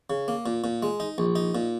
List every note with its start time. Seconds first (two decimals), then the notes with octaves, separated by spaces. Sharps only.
0.10 C#3
0.28 A#3
0.46 A#2
0.64 A#2
0.83 G#3
1.00 D#4
1.18 A#1
1.36 D#4
1.55 A#2